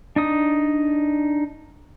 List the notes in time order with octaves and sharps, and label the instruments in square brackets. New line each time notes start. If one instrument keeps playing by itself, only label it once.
[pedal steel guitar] D4 D#4 D#6